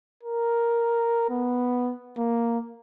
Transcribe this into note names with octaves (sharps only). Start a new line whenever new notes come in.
A#4
B3
A#3